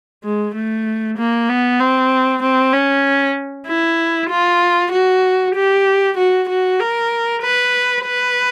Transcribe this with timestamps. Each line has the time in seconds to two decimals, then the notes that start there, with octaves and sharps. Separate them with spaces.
0.24 G#3
0.55 A3
1.17 A#3
1.49 B3
1.80 C4
2.42 C4
2.73 C#4
3.67 E4
4.30 F4
4.92 F#4
5.55 G4
6.17 F#4
6.49 F#4
6.80 A#4
7.42 B4
8.05 B4